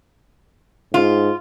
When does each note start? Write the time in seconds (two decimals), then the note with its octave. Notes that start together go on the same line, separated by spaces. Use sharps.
0.94 G#2 F4